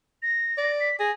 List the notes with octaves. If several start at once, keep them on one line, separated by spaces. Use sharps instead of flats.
A#6
D5
B6
G#4 A#6